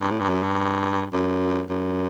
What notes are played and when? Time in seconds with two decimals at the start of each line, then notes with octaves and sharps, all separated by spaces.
0.01 G2
0.11 A2
0.20 G2
0.29 F#2
0.43 G2
1.13 F#2
1.69 F#2